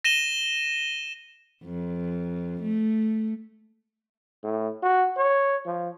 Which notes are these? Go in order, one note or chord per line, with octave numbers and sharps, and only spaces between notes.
A#6 D#7 E7 G7
F2
A3
A2
F#4
C#5
F3